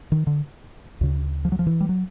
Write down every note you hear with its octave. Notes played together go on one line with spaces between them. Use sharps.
D#3
D3
D2 C#3
F3
F#3
F3
E3
G3
F#3